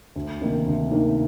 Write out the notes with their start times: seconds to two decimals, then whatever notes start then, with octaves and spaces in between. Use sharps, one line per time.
0.16 D2
0.40 C3 D#3 A#3 D#4
0.66 D2
0.91 C3 D#3 A#3 D#4